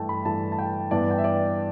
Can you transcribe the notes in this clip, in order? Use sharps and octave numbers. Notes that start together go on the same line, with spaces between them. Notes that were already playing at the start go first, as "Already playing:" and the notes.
Already playing: G2 E3 A3 G5 A5
B5
G2 E3 A3 A5
A5
G5
G2 E3 B3 D5
G5
E5
D5